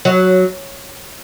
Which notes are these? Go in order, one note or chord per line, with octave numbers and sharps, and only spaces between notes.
F#3